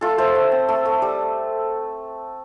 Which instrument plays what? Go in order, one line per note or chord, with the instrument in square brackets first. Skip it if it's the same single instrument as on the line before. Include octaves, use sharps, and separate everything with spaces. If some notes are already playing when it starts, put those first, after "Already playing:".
[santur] A3 F4 A4
A3 C5 E5
A3
C4
A3
A3
G3